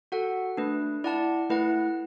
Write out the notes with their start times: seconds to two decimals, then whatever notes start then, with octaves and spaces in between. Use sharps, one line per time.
0.12 F#4 A4 F#5
0.57 A3 D4 B4
1.04 E4 D5 F#5 A5
1.50 A3 E4 B4 F#5